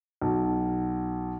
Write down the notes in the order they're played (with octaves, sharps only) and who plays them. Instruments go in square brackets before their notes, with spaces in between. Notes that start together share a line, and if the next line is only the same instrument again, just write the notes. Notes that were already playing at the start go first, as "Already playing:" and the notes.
[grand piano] B1